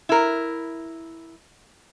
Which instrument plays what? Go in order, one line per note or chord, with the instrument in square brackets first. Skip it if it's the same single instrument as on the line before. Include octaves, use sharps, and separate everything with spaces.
[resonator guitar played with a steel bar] E4 A#4